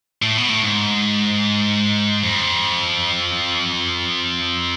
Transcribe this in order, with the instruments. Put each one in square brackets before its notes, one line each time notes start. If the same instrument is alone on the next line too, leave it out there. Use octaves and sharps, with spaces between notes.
[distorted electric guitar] A2
B2
A2
G#2
F2